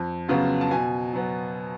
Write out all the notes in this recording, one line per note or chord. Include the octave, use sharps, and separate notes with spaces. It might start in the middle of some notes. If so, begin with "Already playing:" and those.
Already playing: F2
C#3 F#3 B3 F4
A5
B2 G#5
F#3 B3